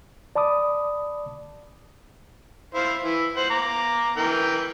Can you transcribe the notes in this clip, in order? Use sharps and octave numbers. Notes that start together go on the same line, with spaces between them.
D5 A5 B5 D6 D#6
E4 C5 F5
E3 E4
C5 F#5
A#5 D6
E3 A#4 G5